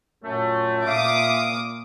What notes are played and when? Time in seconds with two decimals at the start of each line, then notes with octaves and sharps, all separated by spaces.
0.24 F#2 A#2 A3
0.86 A#2 E5 F5 D6 D#6